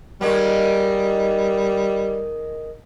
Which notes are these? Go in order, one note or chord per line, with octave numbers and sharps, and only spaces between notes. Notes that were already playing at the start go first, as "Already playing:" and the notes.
D#3 G3 G#3 A#3